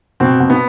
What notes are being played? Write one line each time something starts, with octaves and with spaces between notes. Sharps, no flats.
B2 C4
B2
B3